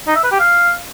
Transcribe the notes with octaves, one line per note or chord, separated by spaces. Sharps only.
D#4
E5
B4
G4
F5